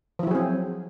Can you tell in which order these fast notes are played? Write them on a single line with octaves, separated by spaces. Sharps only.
F3 E4 F#3 G#4 C4